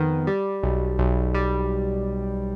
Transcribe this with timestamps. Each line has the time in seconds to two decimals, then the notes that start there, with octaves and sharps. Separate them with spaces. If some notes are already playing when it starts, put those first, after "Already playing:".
Already playing: F2 D#3 B3
0.27 G3
0.63 B1
0.98 B1
1.34 G3